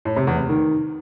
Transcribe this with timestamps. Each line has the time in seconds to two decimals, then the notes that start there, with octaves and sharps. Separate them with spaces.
0.05 A2
0.16 C3
0.27 E2
0.38 C3
0.49 D#3